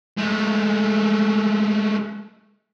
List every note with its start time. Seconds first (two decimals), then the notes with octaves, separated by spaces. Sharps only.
0.17 G#3 A3